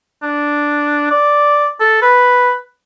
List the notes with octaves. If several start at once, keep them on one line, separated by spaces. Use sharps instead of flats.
D4
D5
A4
B4